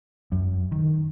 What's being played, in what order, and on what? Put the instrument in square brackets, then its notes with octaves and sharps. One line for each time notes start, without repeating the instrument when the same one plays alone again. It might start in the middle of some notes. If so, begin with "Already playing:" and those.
[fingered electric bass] F#2
D#3